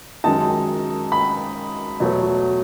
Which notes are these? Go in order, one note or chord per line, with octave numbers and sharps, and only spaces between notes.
F#2 D#3 G#3 D#4 A5
B5
E2 B2 F#3 A3